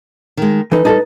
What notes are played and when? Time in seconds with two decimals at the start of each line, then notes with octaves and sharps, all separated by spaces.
0.37 D#3 G#3
0.72 E3 D#4 A4 B4
0.85 G3 D#4 G#4 A4 A5